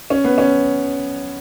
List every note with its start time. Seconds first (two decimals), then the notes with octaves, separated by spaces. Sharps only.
0.10 C#4
0.24 B3
0.38 C#4